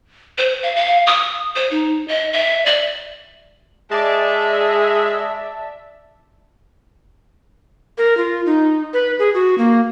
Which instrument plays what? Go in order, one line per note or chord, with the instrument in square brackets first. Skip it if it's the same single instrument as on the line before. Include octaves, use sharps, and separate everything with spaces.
[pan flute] C5
F5
F5
D#6
C5
D#4
D#5
E5
D5
[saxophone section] G#3 G#4 [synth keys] D5 A5 [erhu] E5
[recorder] A#4
F4
D#4
B4
G#4
F#4
A#3